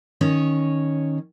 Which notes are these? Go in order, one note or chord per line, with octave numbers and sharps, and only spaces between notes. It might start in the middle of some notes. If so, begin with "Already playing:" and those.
D#3 C#4 C#5